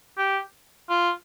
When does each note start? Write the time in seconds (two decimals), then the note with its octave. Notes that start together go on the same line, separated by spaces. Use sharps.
0.18 G4
0.89 F4